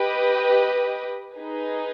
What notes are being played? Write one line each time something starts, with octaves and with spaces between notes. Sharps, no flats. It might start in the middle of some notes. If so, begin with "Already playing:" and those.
Already playing: G4 B4 D#5
D#4 G#4 B4